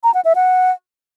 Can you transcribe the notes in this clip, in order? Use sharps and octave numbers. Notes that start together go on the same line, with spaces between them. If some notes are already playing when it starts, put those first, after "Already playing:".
A#5
F#5
E5
F#5